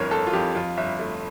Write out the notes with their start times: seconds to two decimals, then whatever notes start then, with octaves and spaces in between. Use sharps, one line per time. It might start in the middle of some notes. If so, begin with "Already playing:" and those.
Already playing: G1 F2 E3 A#4 C#5
0.11 G1 A4
0.27 F4
0.33 F2 G4
0.55 F2 F4
0.77 G1 E5
0.99 A3